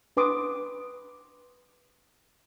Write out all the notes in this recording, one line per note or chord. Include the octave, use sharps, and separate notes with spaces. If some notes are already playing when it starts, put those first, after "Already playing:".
D4 B4 C6 D6 D#6